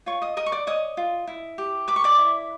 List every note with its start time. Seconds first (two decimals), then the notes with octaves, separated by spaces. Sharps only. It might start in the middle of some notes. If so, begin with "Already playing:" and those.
0.06 F4 C#5 C#6
0.22 D#5 D#6
0.37 A#4 D#5 D#6
0.46 C#6
0.52 D5 D6
0.67 C#5 D#5 D#6
0.97 F4
1.27 E4
1.58 G4
1.88 B4 D6
1.96 C#6
2.04 D5 D6
2.18 E4